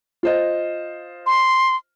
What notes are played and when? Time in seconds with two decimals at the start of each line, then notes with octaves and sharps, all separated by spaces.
0.23 F4 C5 D#5
1.26 C6